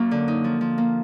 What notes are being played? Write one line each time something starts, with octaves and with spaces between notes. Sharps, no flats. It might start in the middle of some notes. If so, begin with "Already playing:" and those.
Already playing: F#2 F#3 A#3
D3
D#4
F3
F3
A#3